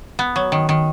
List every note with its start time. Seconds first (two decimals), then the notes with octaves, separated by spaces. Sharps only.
0.19 B3
0.36 F#3
0.52 D#3
0.69 D#3